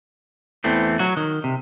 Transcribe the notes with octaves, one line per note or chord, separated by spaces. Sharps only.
E2 E3 A3 C4
F#3 F#4
D#3
C3